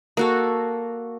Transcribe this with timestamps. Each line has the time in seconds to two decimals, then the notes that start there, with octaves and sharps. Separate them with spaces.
0.17 A#3 F#4 A4